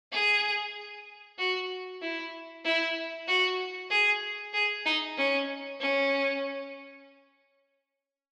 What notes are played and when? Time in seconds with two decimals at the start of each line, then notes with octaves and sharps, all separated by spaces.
0.12 G#4
1.38 F#4
2.02 E4
2.65 E4
3.28 F#4
3.90 G#4
4.53 G#4
4.86 D#4
5.17 C#4
5.80 C#4